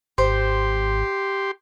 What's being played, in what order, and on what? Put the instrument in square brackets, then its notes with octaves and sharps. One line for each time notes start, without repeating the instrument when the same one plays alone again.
[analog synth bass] G#1 [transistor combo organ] G4 C6 [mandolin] C5